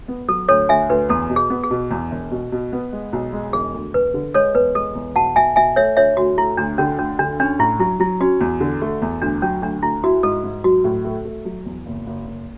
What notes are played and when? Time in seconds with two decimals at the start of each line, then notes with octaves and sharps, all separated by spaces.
0.08 B3
0.28 F#3 A4
0.48 D2 A4 C#5
0.69 D2 E5 G#5
0.90 D2 B4
1.09 E2 A4
1.30 B2
1.36 G#4
1.50 B3
1.63 G#4
1.71 B2
1.91 E2
2.11 E1
2.31 B2
2.52 B2
2.72 B3
2.92 G#3
3.13 B1
3.33 G#3
3.53 E1 G#4
3.74 D2
3.94 E1 B4
4.14 D3
4.34 G#3 A4 C#5
4.54 E2 B4
4.75 G#3 A4
4.95 E2
5.16 B1 F#5 A5
5.36 B1 E5 G#5
5.56 B1 E5 G#5
5.76 A3 C#5 E5
5.97 D2 C#5 E5
6.17 D2 F#4
6.37 A3 E4
6.57 D2 D4
6.78 D3 C#4
6.99 D2 C#4
7.19 D3 D4
7.40 C#4 D4
7.59 A2 E4
7.79 F#3 E4
8.00 F#3 E4
8.20 C#4 F#4
8.41 E2
8.60 D3
8.81 A3
9.02 E2
9.22 D2 D4
9.42 F#3 C#4
9.62 D2 D4
9.82 D2 E4
10.03 E4 F#4
10.23 G#2 A4
10.44 G#2
10.64 F#3 F#4
10.84 A2
11.04 A3
11.25 A3
11.45 F#3
11.66 E2
11.86 F#1
12.07 F#1
12.27 F#1